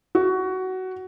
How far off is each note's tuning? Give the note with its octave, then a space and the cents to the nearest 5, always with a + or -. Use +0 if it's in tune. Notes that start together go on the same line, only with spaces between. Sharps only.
F#4 +15